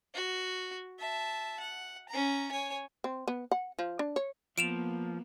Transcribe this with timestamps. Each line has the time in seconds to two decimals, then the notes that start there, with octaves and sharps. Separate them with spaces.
0.14 F#4
0.99 E5 A5
1.60 F#5
2.09 C#4 A#5
2.52 C#5 G#5
3.04 C4
3.28 B3
3.52 F#5
3.79 F3
3.99 D4
4.16 C#5
4.58 F3 A#3 B3 D7 E7 F7